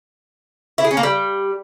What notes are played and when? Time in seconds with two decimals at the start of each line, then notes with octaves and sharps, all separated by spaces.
0.78 E4
0.84 G#4
0.91 C#4
0.97 A#3
1.03 G3